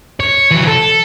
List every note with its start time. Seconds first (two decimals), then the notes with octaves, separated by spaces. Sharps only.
0.20 C#5
0.51 E3 F#3
0.67 A4